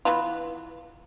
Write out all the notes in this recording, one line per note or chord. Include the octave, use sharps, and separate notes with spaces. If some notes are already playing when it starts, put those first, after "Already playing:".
E3 B3 F4